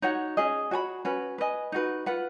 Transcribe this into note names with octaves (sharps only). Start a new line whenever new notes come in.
D#4 F#4 C#5 F#5
C#4 G#4 D#5
F#4 C#5 G#5 B5
C#4 F#4 B4
B4 D#5 G#5
D#4 F#4 B4
F4 B4 F#5